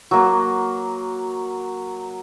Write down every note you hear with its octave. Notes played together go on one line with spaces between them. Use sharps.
F#3 A#3